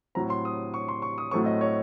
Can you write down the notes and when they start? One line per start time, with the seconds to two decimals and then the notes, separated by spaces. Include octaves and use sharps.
0.15 A2 F#3 C4 A#5
0.30 C6
0.45 D#6
0.74 C#6
0.88 C6
1.02 C#6
1.18 D#6
1.31 A2 F#3 A3 C4 C#6
1.46 D#5
1.61 C#5